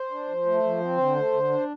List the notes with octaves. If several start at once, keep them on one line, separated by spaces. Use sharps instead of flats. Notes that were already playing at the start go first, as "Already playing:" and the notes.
Already playing: C5
D4
F3
A3
F3
C4
D3
A3
D3
D4